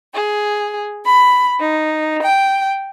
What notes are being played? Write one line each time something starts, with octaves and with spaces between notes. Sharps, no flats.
G#4
B5
D#4
G5